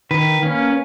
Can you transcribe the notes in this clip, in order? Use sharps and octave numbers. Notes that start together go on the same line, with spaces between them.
D#3 B4
A#3 C#4